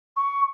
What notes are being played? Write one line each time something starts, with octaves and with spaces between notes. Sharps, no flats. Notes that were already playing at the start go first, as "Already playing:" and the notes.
C#6